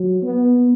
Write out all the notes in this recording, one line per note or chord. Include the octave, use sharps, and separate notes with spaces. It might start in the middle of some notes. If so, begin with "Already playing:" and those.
Already playing: F#3
B3